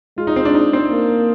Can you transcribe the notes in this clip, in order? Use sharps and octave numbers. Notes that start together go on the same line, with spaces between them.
G#3 F4
D#4
C4
D4
D#4
C4
A#3